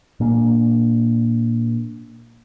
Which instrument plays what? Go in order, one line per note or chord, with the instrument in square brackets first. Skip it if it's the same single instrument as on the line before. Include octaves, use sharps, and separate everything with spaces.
[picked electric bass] A#2 A#3 D4